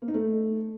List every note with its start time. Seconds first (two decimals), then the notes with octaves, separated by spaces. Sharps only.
0.02 A#3
0.08 D#4
0.14 A3